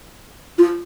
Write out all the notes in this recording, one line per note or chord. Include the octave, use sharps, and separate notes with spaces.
F4